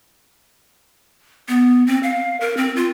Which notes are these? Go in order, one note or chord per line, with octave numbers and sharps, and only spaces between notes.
B3
C4
F5
A#4
C4
F4